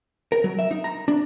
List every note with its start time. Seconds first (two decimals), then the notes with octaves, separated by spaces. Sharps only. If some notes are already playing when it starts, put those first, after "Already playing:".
0.32 A#4
0.44 F#3
0.59 E5
0.71 D#4
0.84 A#5
1.08 D4